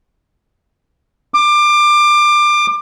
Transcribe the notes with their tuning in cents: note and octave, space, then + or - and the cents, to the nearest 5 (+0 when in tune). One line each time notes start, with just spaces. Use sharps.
D6 +25